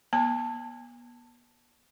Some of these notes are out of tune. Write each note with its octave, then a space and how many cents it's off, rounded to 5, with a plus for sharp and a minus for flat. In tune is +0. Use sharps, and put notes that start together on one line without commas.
B3 -35 A5 +10